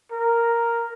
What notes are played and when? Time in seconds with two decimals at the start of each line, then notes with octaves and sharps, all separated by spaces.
0.11 A#4